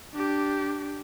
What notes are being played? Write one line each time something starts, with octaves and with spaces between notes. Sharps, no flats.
D4 G4